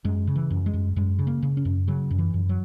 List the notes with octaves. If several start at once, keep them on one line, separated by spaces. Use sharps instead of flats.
F#2 G#3
C#3
E3
F#2
G#3
F#2
F#2 G#3
C#3
A#3
C#3
C#4
F#2
C#3 F#3
F#2
E3
F#2
F#3